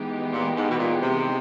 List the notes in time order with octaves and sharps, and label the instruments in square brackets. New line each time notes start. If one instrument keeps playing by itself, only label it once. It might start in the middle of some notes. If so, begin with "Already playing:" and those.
Already playing: [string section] E3 G#3 B3 D#4 G4
[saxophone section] A#2
G#2
B2
A#2
C3